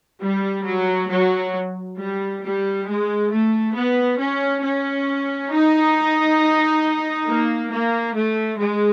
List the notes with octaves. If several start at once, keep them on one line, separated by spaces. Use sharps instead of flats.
G3
F#3
F#3
G3
G3
G#3
A3
B3
C#4
C#4
D#4
A#3
A#3
A3
G#3